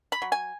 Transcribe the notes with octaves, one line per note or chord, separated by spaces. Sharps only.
B5
F#3
G#5